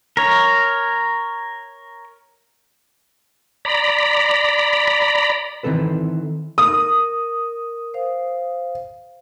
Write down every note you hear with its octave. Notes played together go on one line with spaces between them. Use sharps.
A#4 C#5
D5 A#5 B5
D#3 E3 C4 A4 B4
A#4 D#6
C5 F5